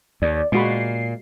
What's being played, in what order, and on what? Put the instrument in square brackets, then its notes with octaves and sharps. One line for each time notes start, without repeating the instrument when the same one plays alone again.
[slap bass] D#2 [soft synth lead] D5
[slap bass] A#2 [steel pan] G#3 F#4 B5 [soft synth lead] C7